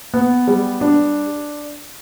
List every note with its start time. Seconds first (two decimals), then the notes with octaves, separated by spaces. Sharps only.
0.14 B3
0.47 G3
0.81 D4